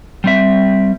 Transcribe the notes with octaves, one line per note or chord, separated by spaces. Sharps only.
G3 C4 E5